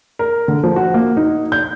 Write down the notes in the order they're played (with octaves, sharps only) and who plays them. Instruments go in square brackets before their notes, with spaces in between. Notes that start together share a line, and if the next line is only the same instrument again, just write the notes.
[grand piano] A#4
D3
F3
F#4
A#3
D#4
G6